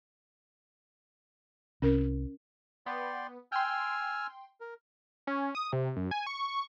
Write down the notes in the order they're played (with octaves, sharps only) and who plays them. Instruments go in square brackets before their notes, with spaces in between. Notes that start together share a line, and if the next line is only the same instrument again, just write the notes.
[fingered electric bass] C2 [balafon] C#4 A#4
[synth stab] B3 [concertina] D5 G5 C6
[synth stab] G5 C6 [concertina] G#5 E6 F6
[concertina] A#4
[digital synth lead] C#4
D#6
C3
F#2
G#5
C#6